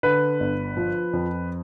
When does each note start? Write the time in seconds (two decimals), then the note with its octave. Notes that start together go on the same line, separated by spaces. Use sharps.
0.03 D3 B4
0.40 G1
0.77 F3
1.13 F2